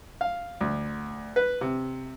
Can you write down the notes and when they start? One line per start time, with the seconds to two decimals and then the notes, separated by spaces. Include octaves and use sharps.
0.21 F5
0.61 D2
1.36 B4
1.61 C3